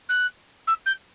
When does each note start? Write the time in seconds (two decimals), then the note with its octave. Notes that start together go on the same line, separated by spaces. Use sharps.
0.09 F#6
0.67 E6
0.85 G6